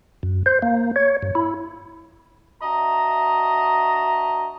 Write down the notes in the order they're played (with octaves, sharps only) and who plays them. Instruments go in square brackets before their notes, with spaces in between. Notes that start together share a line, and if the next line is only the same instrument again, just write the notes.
[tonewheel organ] F#2
C5
A#3
C#5
G2
E4
[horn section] D4 F#4 D#5 E5 A5 A#5